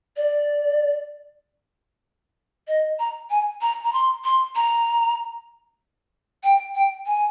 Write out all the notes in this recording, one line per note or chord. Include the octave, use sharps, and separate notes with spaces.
D5
D#5
A#5
G#5
A#5
A#5
C6
C6
A#5
G5
G5
G#5